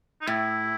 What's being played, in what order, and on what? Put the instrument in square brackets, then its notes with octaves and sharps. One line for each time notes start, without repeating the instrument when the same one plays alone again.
[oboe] D#4
[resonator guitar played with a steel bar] A2 [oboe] E4